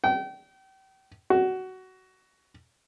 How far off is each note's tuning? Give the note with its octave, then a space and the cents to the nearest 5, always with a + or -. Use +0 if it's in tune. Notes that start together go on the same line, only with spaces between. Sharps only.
G5 -35
F#4 +15